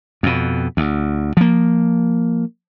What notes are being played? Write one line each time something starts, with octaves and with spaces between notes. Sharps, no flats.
F2 B2
D2
F3 A#3